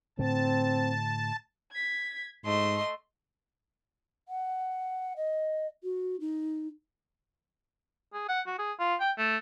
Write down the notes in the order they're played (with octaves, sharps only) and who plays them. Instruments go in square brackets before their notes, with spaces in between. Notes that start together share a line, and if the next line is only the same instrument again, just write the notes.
[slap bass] A2 D3 [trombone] C4 [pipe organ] A5
[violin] G#6 B6
[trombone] G#2 [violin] A3 [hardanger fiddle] D#5 C6
[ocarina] F#5
D#5
F#4
D#4
[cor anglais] G#4
F#5
F#4
G#4
F4
G5
A3